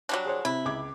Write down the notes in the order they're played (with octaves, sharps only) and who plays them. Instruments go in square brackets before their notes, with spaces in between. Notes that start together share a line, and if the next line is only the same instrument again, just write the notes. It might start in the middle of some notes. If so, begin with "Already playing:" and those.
[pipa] F#3 G3 D4
[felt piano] G#4 C5 C#5
[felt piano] C3 [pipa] E4
[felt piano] C#2 D6 G#6